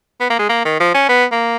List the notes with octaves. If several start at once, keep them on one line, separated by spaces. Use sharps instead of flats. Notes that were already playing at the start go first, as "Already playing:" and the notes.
B3
A#3
G#3
A#3
D#3
F3
C#4
B3
A#3